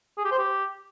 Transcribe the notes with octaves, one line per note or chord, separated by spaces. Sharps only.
G#4
G4
C5
G4